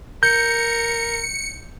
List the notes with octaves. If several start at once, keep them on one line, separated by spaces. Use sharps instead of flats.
A#4 G6 C#7